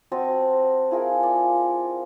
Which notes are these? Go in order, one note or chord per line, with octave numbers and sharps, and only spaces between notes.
C4 F#4 D#5 A5
E4 F4 G#4 A#4
D5